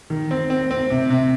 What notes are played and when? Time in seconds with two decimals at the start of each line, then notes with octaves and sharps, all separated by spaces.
0.10 D#3
0.31 C4
0.50 C4
0.71 C4
0.90 C3
1.10 C3